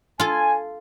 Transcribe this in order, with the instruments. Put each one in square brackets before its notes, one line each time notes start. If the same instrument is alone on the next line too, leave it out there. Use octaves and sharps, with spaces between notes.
[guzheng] F4 A4 [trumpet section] G#5